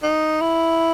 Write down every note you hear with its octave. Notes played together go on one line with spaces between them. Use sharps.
D#4
E4